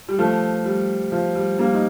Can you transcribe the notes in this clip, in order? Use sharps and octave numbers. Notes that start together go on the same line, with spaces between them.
G3
F3 A3
G3
F3
G3
G3 A#3
D#4